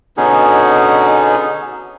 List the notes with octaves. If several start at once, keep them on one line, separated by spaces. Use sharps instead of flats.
B2 D3 B3 C#4 D#4 G#4